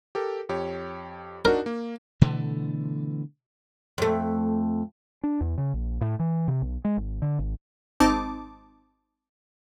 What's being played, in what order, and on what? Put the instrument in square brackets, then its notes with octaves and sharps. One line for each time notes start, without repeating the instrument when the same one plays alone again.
[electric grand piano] G4 A4 A#4
F2 G4 C#5
[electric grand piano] D4 D#4 F#4 [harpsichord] A#4
[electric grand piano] A#3
[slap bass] B2 D3 E3 A3
[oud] F2 A3
[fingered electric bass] D4
E2
C#3
A#1
A2
E3
C3
B1
G#3
G#1
D3
G#1
[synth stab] G#1 C4 D#4 A5 D6